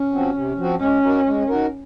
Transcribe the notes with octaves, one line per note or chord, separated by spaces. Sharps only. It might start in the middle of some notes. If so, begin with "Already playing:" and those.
Already playing: C#4
F3 C4 F#4
C3
F3 C4 F#4
G#3 C#4
D#4 F#4 A#4
G#3
D#4 F#4 A#4